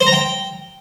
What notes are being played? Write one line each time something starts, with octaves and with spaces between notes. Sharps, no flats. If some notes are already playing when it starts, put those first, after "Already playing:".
C5
A#5
G5